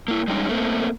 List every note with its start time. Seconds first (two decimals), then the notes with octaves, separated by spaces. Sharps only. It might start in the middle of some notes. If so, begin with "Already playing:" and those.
0.08 A#3 E4
0.28 G3 G#3 C#4 D#4
0.49 A3 A#3 C4